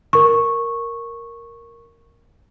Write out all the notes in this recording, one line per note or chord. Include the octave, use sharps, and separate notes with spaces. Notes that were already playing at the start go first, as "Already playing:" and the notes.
A#4 C#6